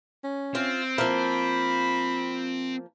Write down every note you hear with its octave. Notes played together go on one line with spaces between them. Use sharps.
C#4
C4 F4
F3 A#3 B5